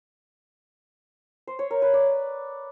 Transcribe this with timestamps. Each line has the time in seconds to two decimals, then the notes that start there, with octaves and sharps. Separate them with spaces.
1.47 C5
1.59 C#5
1.71 A#4
1.82 B4
1.94 D5